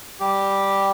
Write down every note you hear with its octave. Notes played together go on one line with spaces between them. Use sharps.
G3 G4